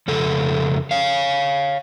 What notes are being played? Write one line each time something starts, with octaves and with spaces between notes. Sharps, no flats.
F2 C#3 A4
C#5 F5